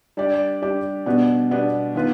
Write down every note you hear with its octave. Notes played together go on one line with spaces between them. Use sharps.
G3 D4 G4 D5
G3 D4 G4 D5
B2 G3 B3 D4
B2 G3 B3 D4
D#3 B3 F4 B4